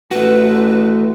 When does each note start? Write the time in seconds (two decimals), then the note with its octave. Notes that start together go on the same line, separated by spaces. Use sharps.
0.11 A1 A3 F#4 B4